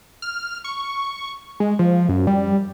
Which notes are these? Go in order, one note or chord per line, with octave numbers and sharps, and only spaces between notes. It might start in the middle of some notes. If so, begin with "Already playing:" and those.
F6
C#6
G#3
F3
F#2
G3